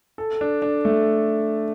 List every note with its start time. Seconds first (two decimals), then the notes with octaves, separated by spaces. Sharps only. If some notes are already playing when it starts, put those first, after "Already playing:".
0.18 A4
0.41 D4
0.62 D4
0.85 A3